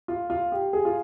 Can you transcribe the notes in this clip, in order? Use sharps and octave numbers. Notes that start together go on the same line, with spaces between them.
F4
F4
G4
G#4
F4